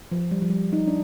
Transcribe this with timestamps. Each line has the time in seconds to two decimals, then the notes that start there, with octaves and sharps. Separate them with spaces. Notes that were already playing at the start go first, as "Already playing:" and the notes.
0.12 F3
0.31 G3
0.42 F3
0.50 G3
0.73 D#4
0.87 D4